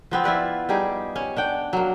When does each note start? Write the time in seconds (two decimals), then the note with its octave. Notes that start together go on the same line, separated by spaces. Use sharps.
0.11 F3 B3 C4
0.24 E4 F4 B4 D5
0.69 G3 D#4 G4 G#4
1.16 C#4
1.36 D4 F#5 G5
1.73 F#3 A#3